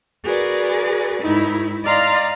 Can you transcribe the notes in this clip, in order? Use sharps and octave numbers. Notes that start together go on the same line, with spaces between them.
F#4 G#4 A#4 B4 D5
G#2 D#3 D#4 E4
D5 D#5 F5 A#5 C6